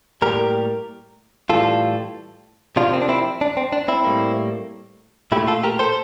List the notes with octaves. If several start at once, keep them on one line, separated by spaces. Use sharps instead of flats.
A2 G3 A#3 G4 A#4
A2 E3 G3 F4 A4
C3 F3 A#3 D4 F4
C4
D4
C4 E4
D4
C4
D4
C4 E4
A2 G3 A#3
A#2 A3 E4 G4
F4 A4
G4 A#4
A4 C5